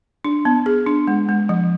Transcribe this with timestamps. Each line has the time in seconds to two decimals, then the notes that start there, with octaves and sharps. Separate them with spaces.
0.25 D4
0.45 B3
0.66 G#4
0.87 D4
1.07 G#3
1.29 G#3
1.49 F3